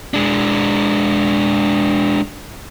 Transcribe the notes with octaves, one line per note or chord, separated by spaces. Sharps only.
G#3 D4